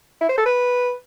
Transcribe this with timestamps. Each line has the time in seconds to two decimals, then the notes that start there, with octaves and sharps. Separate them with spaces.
0.21 E4
0.29 C5
0.38 A4
0.46 B4